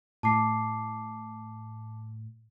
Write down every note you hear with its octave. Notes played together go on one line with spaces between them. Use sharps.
A2 A5 D6 C7